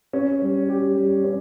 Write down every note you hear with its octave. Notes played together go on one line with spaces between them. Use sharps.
C#4
G3
G4
G3
C#4